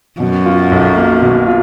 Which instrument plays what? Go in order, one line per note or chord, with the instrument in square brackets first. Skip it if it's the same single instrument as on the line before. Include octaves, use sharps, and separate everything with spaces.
[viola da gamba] F#2 [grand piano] B2
[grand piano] F4
B1
A#3
B2
F4